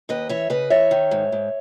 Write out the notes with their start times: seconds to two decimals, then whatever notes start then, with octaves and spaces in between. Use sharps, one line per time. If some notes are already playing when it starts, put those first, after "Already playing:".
0.09 D#2 B4 D#5
0.29 E3 C#5 E5
0.50 C#3 B4 D#5
0.70 E3 C#5 E5
0.91 D#3
1.11 G#2
1.32 G#2